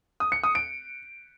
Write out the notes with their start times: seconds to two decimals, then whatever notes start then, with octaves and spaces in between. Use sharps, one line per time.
0.20 D#6
0.32 C#7
0.44 D#6
0.55 D7